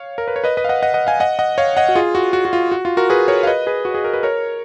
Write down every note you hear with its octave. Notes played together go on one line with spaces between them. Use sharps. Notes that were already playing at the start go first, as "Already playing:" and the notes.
Already playing: C#5 F5
A#4
B4
C#5
B4 D#5
B4 D#5
F5
D#5 F#5
D#5 F#5
D#5 F#5
F5 G#5
D#5 F#5
D#5 F#5
C#5 F5
D#5 F#5
F#4
F4 G#4
F#4
F#4
F#4
F4
F#4
F4
F#4 A#4
G#4 B4
A#4 C#5
F5
B4 D#5
G#4 B4
F#4
G#4
A#4
B4
A#4 C#5